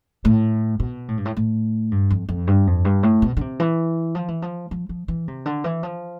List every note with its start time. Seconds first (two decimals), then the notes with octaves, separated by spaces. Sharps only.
0.25 A2
0.80 B2
1.08 A2
1.17 G2
1.25 A2
1.37 A2
1.91 G2
2.11 F2
2.29 F2
2.47 G2
2.67 F2
2.85 G2
3.03 A2
3.22 B2
3.37 D3
3.41 C3
3.60 E3
4.15 F3
4.28 E3
4.42 F3
4.71 F3
4.89 F3
5.08 E3
5.28 C3
5.46 D3
5.64 E3
5.83 F3